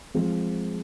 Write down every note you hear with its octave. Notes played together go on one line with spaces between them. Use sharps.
F3 G#3 C4